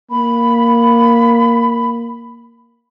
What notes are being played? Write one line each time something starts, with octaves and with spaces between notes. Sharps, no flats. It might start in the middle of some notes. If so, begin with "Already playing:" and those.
A#3 B5